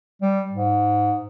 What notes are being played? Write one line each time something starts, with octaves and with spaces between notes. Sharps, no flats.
G3
G#2